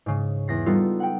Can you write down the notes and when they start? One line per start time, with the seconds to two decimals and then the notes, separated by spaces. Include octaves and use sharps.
0.06 G#2 C#3
0.48 E2 A#6 C7
0.66 G3 B3 D#4 F4 A4
1.00 F#5 G5